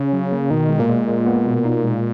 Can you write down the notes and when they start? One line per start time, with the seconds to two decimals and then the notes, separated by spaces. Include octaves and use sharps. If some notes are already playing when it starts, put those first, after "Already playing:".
Already playing: C#3
0.13 F#3
0.32 A#3
0.50 B2 D#3
0.69 G#3
0.80 A#2
0.89 G#3
1.08 G#3
1.27 B3
1.46 B2
1.65 D#4
1.84 G#3